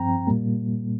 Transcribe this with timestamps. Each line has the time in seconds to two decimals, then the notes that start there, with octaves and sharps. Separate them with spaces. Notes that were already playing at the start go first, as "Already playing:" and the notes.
Already playing: G2 F3 C4 G5 A#5
0.27 A#2 G3 A#3